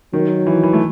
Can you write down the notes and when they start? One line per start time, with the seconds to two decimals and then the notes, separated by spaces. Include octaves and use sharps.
0.13 D#3 F#3
0.47 E3
0.63 E3
0.73 A3